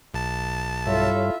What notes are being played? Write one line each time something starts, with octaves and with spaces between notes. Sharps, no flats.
B1 A5
G2 G3 E4 F4 A4 C#5 E5